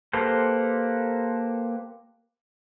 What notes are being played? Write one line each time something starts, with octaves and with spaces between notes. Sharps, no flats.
A#3 G4 A4 B4 C5